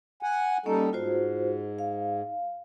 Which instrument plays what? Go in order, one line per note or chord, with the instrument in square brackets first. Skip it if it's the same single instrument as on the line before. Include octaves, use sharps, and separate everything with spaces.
[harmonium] F#5 G#5
[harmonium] G3 D#4 A4 [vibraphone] A#3 C#4 D#5
[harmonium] G#2 [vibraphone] F4 F#4 C5
[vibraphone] F5